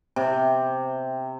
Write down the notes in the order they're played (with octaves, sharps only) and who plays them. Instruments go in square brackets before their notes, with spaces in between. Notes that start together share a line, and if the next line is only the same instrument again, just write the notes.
[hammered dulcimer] C3